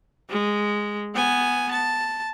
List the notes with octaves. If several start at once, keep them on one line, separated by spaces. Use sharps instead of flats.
G#3
B3 G#5
A5